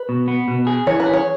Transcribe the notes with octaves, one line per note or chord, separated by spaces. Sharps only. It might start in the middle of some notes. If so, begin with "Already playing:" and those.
Already playing: B4
B2
B3
B2
G#4
E3 C#5
B4
G#4
C#5